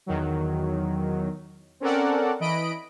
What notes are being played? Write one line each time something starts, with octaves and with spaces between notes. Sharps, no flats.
E2 D#3 F#3
C4 C#4 A4 A#4 D5 F#5
E3 D#5 B5 D7